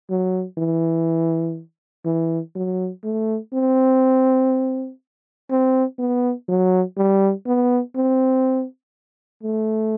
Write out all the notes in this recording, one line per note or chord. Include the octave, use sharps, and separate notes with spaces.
F#3
E3
E3
F#3
A3
C4
C4
B3
F#3
G3
B3
C4
A3